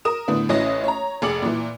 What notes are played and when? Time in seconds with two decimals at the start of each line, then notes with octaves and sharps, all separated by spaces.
0.05 A#4 D#6 E7
0.28 A2 D3 B3
0.49 A1 E3 C#4 D#5 A#6
0.84 C#5 A#5
1.22 F1 G#4 D6 C#7 F#7
1.42 A#2 E3